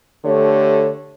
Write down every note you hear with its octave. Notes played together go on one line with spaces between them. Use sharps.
D3 A3 G4 C#5